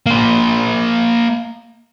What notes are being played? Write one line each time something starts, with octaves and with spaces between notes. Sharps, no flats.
A#3 C5